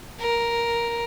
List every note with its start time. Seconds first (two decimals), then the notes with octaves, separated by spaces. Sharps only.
0.19 A#4